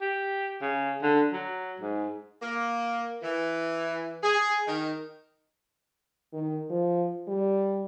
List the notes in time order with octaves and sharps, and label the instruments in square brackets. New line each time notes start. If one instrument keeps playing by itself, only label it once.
[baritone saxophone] G4
C#3
D3
F#3
G#2
[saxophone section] A#3
E3
G#4
D#3
[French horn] D#3
F3
G3